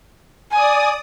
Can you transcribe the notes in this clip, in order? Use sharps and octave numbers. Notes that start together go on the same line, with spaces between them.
D5 G#5 D#6